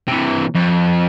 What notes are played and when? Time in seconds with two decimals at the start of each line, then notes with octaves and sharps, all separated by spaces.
0.08 C3 E3
0.55 F2